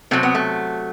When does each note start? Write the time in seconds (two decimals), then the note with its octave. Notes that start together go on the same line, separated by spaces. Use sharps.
0.11 C3 F#3 A3 C4
0.23 B3
0.35 A3